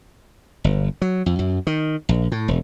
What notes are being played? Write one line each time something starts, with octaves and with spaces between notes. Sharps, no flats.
G1
F#3
F2
F#2
D#3
A#1
A2
E1